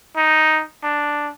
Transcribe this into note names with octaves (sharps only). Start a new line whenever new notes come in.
D#4
D4